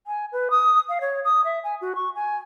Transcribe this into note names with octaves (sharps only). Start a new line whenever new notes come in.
G#5
B4
D#6
F5
C#5
D#6
E5
G#5
F#4
C#6
G#5